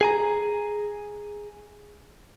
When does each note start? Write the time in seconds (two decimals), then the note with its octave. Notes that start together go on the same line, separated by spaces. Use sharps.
0.01 G#4 G#5 A#5